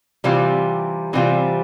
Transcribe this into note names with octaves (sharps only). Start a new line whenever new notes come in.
C3 E3 G3 C4 F4
C3 E3 G3 C4 F4